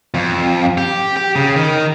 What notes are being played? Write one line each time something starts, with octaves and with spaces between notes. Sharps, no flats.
F2
G4
G4
C#3
D#3